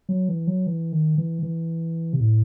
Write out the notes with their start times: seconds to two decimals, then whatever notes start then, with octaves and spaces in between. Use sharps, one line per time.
0.09 F#3
0.29 E3
0.47 F#3
0.67 E3
0.92 D#3
1.18 E3
1.43 E3
2.13 C3
2.20 A2